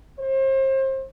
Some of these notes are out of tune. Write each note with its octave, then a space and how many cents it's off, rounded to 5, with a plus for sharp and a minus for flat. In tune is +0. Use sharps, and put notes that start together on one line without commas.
C5 +35